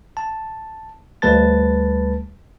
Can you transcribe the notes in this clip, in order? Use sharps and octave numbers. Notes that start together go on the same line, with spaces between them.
A5
D2 G3 A3 B4 A5 A6